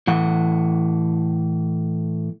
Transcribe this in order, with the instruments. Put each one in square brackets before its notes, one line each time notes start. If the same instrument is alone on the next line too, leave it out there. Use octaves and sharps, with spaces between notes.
[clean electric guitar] A2 E3 F#5